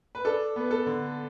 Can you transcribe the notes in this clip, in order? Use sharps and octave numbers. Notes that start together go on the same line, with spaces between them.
B4
D4 A4
B3
A4
D3